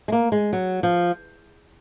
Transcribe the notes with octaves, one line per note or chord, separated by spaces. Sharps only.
G#3
A#3
G#3
F#3
F3